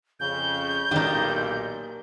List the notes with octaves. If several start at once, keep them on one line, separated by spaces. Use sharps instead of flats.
F2 C#3 G6
B1 A#2 D#3 A#3 D4 D#4 G4